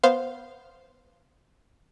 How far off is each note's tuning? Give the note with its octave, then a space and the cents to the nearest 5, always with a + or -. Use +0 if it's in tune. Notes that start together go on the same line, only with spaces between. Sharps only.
B3 +0 C5 +0 F5 -10